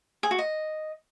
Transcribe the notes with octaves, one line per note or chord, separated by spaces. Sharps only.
G#4
F#4
D#5